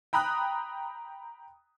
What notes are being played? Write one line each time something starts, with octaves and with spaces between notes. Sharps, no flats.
G5 A#5 B5 D#6 F#6